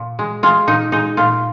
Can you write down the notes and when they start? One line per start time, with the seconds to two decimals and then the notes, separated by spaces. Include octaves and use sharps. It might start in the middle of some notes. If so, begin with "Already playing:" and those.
Already playing: A#2
0.19 G#3
0.43 G#3 F4
0.68 A#2 D#4
0.92 G#3 D#4
1.17 A#2 F4